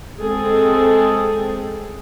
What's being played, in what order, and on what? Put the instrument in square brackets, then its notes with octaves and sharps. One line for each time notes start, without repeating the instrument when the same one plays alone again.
[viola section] G#3 C4 G#4 A4